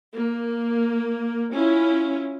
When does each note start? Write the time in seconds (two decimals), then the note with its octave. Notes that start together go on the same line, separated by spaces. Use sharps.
0.16 A#3
1.52 C#4 E4 F4